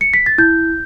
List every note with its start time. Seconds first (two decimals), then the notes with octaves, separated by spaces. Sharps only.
0.01 C#7
0.14 B6
0.26 A6
0.38 E4 G6